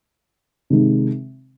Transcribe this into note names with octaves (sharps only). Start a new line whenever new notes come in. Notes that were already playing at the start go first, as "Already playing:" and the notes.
C3 D#3 G#3